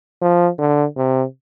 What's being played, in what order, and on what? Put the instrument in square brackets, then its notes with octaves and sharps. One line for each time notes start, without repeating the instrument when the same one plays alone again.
[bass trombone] F3
D3
C3